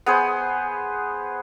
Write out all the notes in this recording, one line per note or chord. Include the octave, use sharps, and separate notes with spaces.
B3 G#4 C5